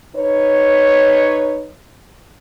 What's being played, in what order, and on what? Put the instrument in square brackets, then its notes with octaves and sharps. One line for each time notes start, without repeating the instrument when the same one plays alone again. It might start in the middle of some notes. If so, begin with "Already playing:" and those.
[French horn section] D#4 B4 C#5